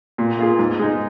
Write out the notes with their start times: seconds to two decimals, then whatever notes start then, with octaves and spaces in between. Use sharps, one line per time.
0.18 A#2
0.39 A#3 F4 G#4
0.59 G#2
0.79 G#3 D#4